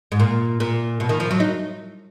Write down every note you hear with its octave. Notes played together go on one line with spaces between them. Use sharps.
G#2
A#2
A#2
B2
D#3
F3
F#3
D#4